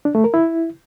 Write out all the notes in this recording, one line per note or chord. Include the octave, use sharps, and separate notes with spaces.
D4
A3
A#4
E4